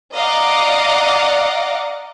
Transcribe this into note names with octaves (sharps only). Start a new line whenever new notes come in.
D5 D#5 F5 F#5 A#5 D6